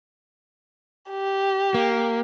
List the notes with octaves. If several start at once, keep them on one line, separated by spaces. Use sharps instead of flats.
G4
A#3